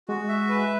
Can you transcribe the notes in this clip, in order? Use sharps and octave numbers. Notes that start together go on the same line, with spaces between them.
G#3 F#4
E5
B4